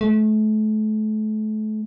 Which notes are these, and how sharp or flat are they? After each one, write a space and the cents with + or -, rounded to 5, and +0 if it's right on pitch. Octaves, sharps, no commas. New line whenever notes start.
A3 -35